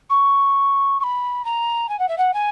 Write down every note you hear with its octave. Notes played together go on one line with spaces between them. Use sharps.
C#6
C#6
B5
A#5
G#5
F#5
E5
F#5
G#5